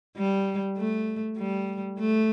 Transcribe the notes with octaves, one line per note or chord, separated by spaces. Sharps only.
G3
A3
G3
A3